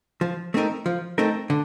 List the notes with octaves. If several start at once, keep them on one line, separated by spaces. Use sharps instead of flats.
F3
A3 C4 D#4 A#4
F3
A3 C4 D#4 A#4
D3